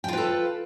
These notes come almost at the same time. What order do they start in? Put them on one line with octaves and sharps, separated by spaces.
G5 F4 B4 A4